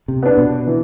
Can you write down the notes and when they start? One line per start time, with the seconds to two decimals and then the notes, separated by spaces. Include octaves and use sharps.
0.08 C3
0.23 B3 D4
0.38 B2
0.67 E3